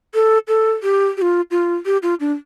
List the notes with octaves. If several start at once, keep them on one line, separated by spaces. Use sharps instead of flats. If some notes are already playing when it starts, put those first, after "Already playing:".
A4
A4
G4
G4
F4
F4
G4
F4
D4